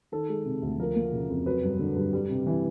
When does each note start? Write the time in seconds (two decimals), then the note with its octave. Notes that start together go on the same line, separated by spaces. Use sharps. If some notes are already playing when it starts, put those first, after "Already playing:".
0.12 D#3 A4
0.29 G#3
0.45 C3
0.62 D2
0.79 F3 A#4
0.95 A#3
1.12 C#3
1.30 F2
1.46 F#3 B4
1.63 G2
1.79 D3
1.96 G2
2.13 G3
2.30 C3
2.46 E3